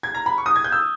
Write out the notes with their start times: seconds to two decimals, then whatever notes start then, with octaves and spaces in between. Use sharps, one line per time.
0.03 G#6
0.15 A#5
0.26 B5
0.38 C#6
0.46 D#6
0.56 G#6
0.64 G6
0.72 E6